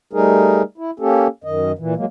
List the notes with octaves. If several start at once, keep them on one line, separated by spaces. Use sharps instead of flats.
G3 A3 D#4 G#4 A#4
E4
A#3 C#4 G4 A4
F#2 D#3 D#5
A#2 E3
F#3 G#3 A#3